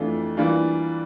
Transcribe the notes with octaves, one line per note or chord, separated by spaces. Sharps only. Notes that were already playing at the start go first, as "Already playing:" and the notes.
Already playing: F2 E3 A3 D4 F4
E3 G3 A#3 D4 F4